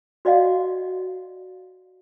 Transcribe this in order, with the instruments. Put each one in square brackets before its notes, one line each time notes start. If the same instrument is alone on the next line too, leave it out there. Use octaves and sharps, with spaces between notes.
[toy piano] F#4 D5 D#5 F5 F#5